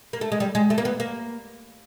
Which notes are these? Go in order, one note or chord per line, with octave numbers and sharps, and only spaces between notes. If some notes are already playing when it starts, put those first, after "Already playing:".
A#3
A3
G#3
G3
G#3
A3
A#3
B3
A#3